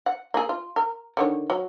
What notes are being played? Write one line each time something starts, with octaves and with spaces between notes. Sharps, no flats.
F#5
A#3 G#4
F4
A#4
D3 D#3 C#5
F#3